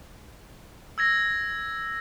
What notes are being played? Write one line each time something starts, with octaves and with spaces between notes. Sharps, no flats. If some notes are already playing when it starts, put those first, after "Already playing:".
E6 G#6 A#6